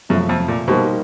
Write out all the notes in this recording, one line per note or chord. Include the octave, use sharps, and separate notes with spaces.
F#2 C3 F3 A3
F2
A#2
B2 G3 A#3 D#4 G4 C5